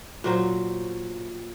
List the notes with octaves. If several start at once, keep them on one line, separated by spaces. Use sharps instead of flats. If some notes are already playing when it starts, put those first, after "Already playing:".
A#2 F#3 C5